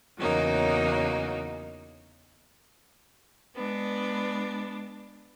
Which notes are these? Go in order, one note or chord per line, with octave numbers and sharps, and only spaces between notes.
E2 C#3 F#3 A#3 D#4
G#3 B3 D4